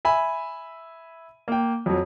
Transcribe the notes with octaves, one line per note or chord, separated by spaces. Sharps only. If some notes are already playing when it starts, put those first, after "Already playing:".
E5 G#5 B5
A#3 G5
F2 F#3